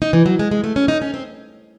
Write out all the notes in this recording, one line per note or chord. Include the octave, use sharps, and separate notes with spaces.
D#4
E3
F#3
G#3
G#3
A3
C#4
D#4
C#4
C4